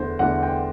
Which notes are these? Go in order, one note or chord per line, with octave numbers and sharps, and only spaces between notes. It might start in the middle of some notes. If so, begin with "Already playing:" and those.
Already playing: E2 D3 A3 C5
E2 D3 A3 F#5
G5